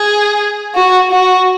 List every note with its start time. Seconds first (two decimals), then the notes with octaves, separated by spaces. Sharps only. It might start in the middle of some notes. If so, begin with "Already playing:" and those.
Already playing: G#4
0.75 F#4
1.11 F#4